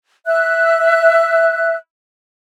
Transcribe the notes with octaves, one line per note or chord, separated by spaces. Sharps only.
E5 F#6